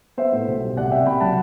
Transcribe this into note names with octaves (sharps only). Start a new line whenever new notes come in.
B3 C5 E5
A2
B1
G3
C2 D5 F#5
C3 E5 G5
C2 G5 B5
F#3 F#5 A5